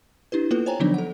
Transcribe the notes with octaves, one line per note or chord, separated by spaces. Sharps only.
D4 E4 G4 B4
A#3 B3 F4 A4 B4
C5 C#5 G5 G#5 A#5
D3 F3 F#3 B3 D4 D#4
A4 F#5